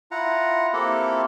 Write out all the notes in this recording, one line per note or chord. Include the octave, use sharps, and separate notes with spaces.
E4 F4 F#5 A#5
A#3 C4 E4 G4 A4